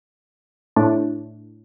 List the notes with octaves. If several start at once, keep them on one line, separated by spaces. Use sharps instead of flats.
A2 A3 D4